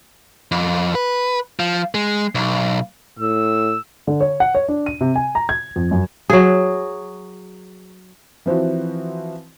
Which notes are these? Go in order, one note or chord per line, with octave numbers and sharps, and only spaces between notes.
F2
B4
F3
G#3
B1
A2 E6
D3
C#5
F#5
C#5
D4
D#7
C3
G#5
A#5
G#6
F2
F#2
F#3 G#4
E3 F3 C4 E4 F#4